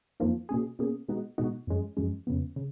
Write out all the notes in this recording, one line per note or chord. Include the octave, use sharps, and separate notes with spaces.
F2 F3 A#3 D#4
B2 A#3 C#4 G#4
B2 A#3 C#4 G#4
B2 G#3 B3 D#4 F#4
B2 G#3 B3 D#4 F#4
F#2 F3 G#3 C#4
F#2 F3 G#3 C#4
F2 C#3 F3 B3
C#3